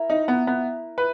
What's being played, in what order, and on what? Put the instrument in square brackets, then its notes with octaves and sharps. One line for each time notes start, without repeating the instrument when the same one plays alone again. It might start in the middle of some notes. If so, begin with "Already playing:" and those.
Already playing: [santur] E4 A#4 E5
[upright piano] D#4
B3
B3
B4